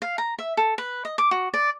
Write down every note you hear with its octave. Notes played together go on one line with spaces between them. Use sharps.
F5
A#5
E5
A4
B4
D#5
D6
F#4
D5